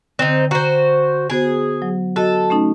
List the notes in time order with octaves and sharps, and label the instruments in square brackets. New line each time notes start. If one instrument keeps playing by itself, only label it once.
[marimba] D3 [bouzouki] C4 D#4
[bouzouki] F#4 C5 [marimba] A#5
[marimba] B3 F#4 C5 [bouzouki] G#4
[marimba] F#3
[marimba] F#4 D#5 [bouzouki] A4
[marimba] A3 C#4 D#4